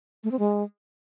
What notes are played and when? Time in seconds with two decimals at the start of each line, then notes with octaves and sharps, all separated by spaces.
0.24 A3
0.31 C4
0.39 G#3